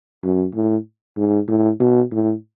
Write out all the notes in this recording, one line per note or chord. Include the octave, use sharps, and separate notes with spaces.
F#2
A2
G#2
A2
B2
A2